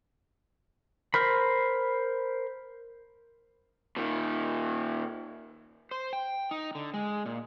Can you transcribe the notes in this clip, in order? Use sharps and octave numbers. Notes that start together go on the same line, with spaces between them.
A#4 C5 B5
A#2 D#3
C5
G5
D#4
D3
G#3
A#2